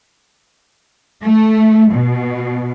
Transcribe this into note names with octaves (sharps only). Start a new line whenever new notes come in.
A3
B2